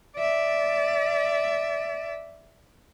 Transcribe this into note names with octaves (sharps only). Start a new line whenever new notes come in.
D5 E5